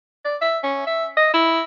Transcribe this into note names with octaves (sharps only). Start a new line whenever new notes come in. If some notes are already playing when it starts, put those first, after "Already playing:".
D5
E5
C#4
E5
D#5
E4